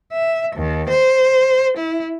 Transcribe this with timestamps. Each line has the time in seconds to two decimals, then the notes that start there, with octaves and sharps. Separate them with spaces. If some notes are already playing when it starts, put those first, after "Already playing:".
0.12 E5
0.56 D#2
0.89 C5
1.77 E4